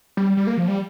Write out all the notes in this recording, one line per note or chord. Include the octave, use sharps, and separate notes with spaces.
G3
G3
A#3
F3
G3